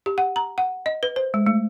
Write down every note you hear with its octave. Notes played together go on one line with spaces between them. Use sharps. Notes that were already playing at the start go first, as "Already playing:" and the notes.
G4
F#5
A#5
F#5
D#5
B4
C5
G#3
A3